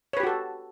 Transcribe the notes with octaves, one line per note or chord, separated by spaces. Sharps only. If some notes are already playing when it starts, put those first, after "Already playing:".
F#4 G4 A4 B4 C#5